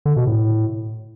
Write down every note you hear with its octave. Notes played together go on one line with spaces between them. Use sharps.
D3
B2
A2